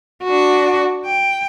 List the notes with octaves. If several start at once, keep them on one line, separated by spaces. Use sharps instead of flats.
D4 F#4
G5